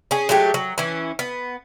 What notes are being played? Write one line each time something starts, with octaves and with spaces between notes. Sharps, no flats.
C#4 G#4
F#3 G#3 A3 G4
F#3
E3 C#4
B3